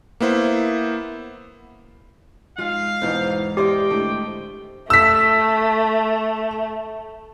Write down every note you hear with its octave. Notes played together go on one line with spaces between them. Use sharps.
A#3 B3 E4 C5
G#2 F4 F5
E2 G#2 B2 E3 D#4 C5
E4 G4 C5 D5 D#5 G5
A2 D3 A3
A3 E6 B6